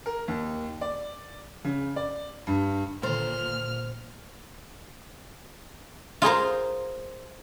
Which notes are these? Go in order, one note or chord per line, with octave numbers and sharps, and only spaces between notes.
A#4
D#2
D5
C#3
D5
G2
A#2 D3 D#3 A4 C5 F6
F4 G#4 A#4 C5